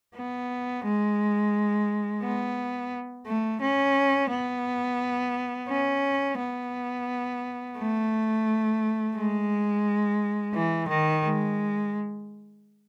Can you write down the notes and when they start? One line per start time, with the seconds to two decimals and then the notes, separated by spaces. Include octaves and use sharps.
0.15 B3
0.85 G#3
2.23 B3
3.26 A3
3.61 C#4
4.31 B3
5.69 C#4
6.38 B3
7.77 A3
9.16 G#3
10.54 E3
10.88 D#3
11.24 G#3